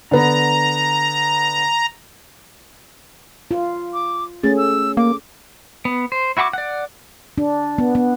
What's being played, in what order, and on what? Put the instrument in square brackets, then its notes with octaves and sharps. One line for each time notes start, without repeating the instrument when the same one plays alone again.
[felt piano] D3 B3 [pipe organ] A#5
[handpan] F4
[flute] D6
[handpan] A3 C#4 G#4 [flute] A6
[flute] E6
[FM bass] A#3 [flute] D6
[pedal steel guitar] B3
C5
E4 F#4 F#5 B5 D6
D5 F#5
[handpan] D4
B3
B3